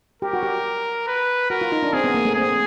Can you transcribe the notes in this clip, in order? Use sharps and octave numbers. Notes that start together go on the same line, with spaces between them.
G4 A#4
F#4
G4
B4
F#4 A#4
F4
D#4
D4
C4 G#4
B3
A#3
A3
C4 G#4